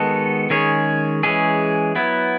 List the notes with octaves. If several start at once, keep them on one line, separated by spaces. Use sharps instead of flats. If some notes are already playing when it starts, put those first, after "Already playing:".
Already playing: D#3 G#3 B3 F#4 A4
D#3 G#3 C#4 G#4 C#5
E3 G#3 C#4 G#4
F#3 B3 E4